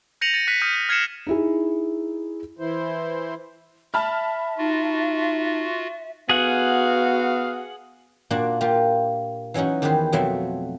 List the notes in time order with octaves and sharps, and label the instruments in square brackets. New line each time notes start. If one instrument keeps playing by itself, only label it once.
[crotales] G6 A#6 C#7 D#7 F7 F#7
A6 C#7 D#7 F7
F#6 B6 D#7
D#6 F6 G6 B6 D#7
G6
F6 G#6 C7 C#7 E7
[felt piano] D#4 E4 G#4
[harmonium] E3 E4 C5
[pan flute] E5 [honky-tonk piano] A5 B5 F6
[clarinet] D#4 [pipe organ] F4 F#4
[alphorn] B3 [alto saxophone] F#4 [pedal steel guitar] G#4 F#5 [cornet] F5
[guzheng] A#2 A#3 D4 F#4 A5
A#3 F4 G4
E3 F#3 C#4 D#4 F#4
E2 D#3 G4 G#4 B4 C5
F2 B2 F#3 A3 E5 C6